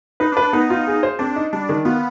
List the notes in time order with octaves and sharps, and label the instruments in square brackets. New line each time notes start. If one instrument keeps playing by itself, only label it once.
[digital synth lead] D#4 [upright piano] B4
[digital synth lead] D4
[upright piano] B4
[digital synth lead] D4
[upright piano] B3 [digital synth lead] D#4
[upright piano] F4
G#4
C5
[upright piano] C4 [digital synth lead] D4
[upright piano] D#4
[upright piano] G3 [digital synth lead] D4
[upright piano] D#3
[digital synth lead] B3 [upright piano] F4